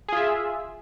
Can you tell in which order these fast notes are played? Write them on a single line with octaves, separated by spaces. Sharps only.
G#4 F4 E5